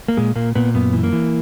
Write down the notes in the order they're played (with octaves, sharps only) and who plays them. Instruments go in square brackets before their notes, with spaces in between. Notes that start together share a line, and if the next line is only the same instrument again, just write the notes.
[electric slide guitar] A#3
A#2 G#3
A#2 A#3
A#2 B3
F#2 B3
E3
A#3
E3